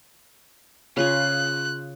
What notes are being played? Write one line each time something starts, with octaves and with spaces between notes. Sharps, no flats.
C#3 F4 G#4 F#6